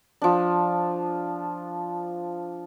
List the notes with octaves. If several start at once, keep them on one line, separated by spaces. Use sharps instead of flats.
F3 D4